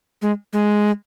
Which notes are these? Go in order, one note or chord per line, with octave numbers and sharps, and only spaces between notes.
G#3
G#3